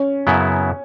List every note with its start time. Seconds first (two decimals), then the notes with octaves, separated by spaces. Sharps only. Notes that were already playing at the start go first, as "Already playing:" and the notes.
Already playing: C#4
0.27 F#2 C#3 F#3 B3 E4